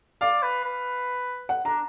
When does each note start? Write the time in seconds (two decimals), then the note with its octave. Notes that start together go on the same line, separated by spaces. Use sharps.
0.21 D5 F5
0.43 B4
0.65 B4
1.49 F#5
1.65 D4 A#5